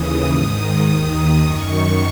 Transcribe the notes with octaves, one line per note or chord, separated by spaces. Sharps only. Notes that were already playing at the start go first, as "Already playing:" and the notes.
Already playing: D#2 C#3 E3 D#6
G#2 D#3
D#2 D#3
F#2 D#3 C#6